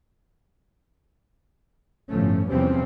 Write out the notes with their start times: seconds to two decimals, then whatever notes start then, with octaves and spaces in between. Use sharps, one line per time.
2.09 G1 A2 F3 A3 C#4
2.49 E2 C3 F3 G3 C4 C#4